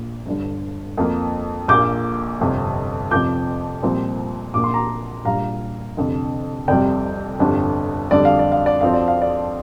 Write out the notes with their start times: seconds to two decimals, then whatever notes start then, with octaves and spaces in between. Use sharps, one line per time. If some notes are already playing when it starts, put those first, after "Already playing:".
Already playing: A#1 A#2 A#3
0.25 G1 G2 D3
0.97 F2 F3 A#3
1.68 A#1 A#2 A#3 D6 G6
2.40 G1 F2 C3
3.11 F1 F2 F3 D6 G6
3.82 C2 A#2 F3 C4
4.54 A#1 A#2 A#3 D6
4.64 C6
4.74 A#5 D6
5.25 A#1 A#2 G3 F5 A#5
5.97 F1 F2 D3
6.68 F1 F2 C3 G3 D5 G5
7.39 G1 F2 D3 G3
8.11 F2 D3 G3 D5
8.25 F5
8.39 D5
8.52 F5
8.66 D5
8.81 F2 F3 C4 F5
8.93 D5
9.08 F5
9.22 D5